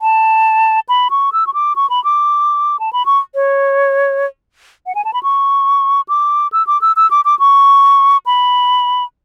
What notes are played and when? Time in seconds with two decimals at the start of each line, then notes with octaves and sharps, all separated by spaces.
0.02 A5
0.89 B5
1.11 C#6
1.33 E6
1.47 C#6
1.54 D6
1.76 C#6
1.90 B5
2.04 D6
2.80 A5
2.93 B5
3.06 C#6
3.35 C#5
4.86 F#5
4.95 G#5
5.05 A5
5.13 B5
5.23 C#6
6.09 D6
6.52 E6
6.67 D6
6.81 E6
6.96 E6
7.11 D6
7.25 D6
7.39 C#6
8.26 B5